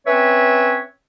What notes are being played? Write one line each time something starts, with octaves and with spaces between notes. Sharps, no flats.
C4 C#4 B4 C#5 E5